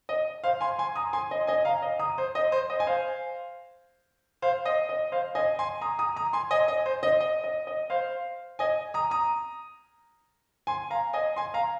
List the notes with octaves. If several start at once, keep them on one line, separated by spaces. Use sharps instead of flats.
D#5
C5 F5
G#5 C6
G#5 C6
A#5 D#6
G#5 C6
D#5
D#5 G#5
F5 A#5
D#5
A#5 D#6
C5
D#5
C5
D#5
G#5
C5 F5
C5 F5
D#5
D#5
C5 F5
D#5 G#5
G#5 C6
A#5 D#6
A#5 D#6
A#5 D#6
G#5 C6
D#5 G#5
D#5
C5
D#5
D#5
D#5
D#5
C5 F5
D#5 G#5
A#5 D#6
A#5 D#6
G#5 C6
F5 A#5
D#5 G#5
G#5 C6
F5 A#5